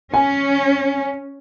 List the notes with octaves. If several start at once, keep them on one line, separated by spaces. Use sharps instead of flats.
C#4 G#5